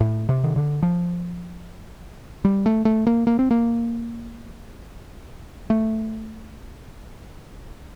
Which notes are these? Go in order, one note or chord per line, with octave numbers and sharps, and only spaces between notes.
A2
C3
D#3
D3
F3
G3
A3
A3
A#3
A#3
C4
A#3
A3